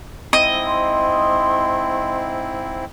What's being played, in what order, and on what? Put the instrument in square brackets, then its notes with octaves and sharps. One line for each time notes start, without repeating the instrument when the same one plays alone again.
[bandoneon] G#2 C4 E4 [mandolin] D#5
[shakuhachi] C6